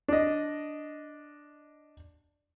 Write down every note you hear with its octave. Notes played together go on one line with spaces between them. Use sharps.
D4 D#5